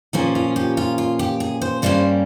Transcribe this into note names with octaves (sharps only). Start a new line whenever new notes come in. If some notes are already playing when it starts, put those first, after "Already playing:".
A#2 F3 A#3 C#4 G#4
F4
G4
F4
F4
G4
G#4
C5
G2 G3 A#3 C#4 C5